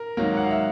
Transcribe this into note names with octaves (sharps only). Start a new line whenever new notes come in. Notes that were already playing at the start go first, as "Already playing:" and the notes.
Already playing: A#4
G#2 D#3 F#3 A#3
F#5
F5
E5